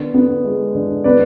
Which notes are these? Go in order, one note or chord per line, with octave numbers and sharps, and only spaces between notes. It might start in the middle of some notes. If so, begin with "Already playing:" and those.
Already playing: D3 B3
B3
G#3
D3
B3 B4 D5